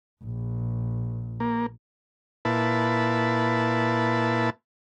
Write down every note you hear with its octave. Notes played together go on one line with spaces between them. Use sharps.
A#1
A#3
A#2 E4 B4 A5